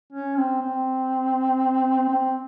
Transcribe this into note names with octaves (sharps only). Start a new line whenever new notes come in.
C#4
C4
C4
C4